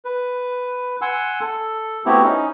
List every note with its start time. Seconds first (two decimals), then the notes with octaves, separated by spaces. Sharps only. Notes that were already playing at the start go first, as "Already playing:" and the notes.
0.05 B4
1.02 F#5 G#5 C6 E6
1.41 A4
2.06 A3 B3 C4 E4 F#4 G4
2.24 C#4 D#4